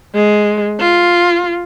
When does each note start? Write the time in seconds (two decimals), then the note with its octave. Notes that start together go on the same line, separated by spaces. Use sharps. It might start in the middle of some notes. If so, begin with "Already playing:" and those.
0.15 G#3
0.80 F4